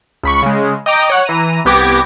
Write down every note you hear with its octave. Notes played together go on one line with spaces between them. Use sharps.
C#2 B5 C#6
C#3 G#3
D#5 G5 A#5 D6 D7
C#5 F#5
E3 A#5 D#7
C2 B3 G4 D6 G#6 A#6